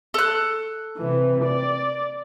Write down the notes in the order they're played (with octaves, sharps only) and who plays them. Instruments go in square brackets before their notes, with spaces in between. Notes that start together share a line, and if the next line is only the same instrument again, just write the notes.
[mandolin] A4 F#6
[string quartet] C3 E3
D5